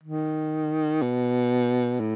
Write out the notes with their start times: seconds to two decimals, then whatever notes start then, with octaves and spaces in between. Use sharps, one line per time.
0.04 D#3
1.02 B2
2.00 A2